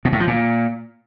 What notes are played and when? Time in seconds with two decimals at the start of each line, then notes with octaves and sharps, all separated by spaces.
0.05 B2
0.12 A2
0.20 F3
0.27 A#2